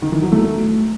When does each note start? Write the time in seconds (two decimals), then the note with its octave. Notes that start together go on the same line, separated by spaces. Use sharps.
0.02 D#3
0.12 E3
0.22 F#3
0.32 A3